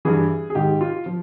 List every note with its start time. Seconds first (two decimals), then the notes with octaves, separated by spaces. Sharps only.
0.05 G2 E3 G#4
0.50 G#4
0.55 G#2 D#3 G4
0.81 F4
1.06 F3